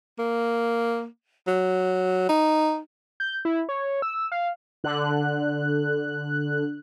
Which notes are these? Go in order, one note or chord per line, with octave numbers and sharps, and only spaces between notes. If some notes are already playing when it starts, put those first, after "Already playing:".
A#3
F#3
D#4
G6
E4
C#5
E6
F5
D3 F#6